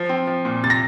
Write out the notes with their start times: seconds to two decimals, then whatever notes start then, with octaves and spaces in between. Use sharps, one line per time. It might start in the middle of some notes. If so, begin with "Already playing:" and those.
Already playing: F3
0.09 C4
0.27 F3
0.45 A#2
0.63 C3 A6
0.70 A#6